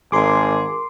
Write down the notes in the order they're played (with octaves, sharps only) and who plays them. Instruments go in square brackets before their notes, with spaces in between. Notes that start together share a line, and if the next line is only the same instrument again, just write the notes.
[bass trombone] G#1 [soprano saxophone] G#4 [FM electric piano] A#4 C6 D6